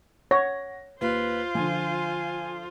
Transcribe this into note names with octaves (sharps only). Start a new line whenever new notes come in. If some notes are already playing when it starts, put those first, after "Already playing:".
C#5 F#5 A#6
D#2 F4 B4 C5
D3 F3 G#5